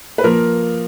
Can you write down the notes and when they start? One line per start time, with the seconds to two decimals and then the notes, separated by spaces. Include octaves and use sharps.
0.18 B4
0.24 F3 A#3 A#4